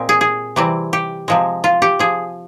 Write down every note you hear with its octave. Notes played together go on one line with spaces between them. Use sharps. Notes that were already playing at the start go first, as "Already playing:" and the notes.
Already playing: A#2 G#3 C4
G#4
G#4
C3 E3 G3 C4
G4
C3 F3 G#3
F4
G4
F3 G#4